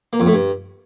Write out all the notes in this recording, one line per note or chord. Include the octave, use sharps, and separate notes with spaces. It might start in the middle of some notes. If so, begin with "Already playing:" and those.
A#3
F2
A2
G2